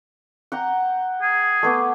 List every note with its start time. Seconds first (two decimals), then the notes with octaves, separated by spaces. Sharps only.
0.52 F#5 G5 A#5
1.22 G#4
1.63 A3 B3 D6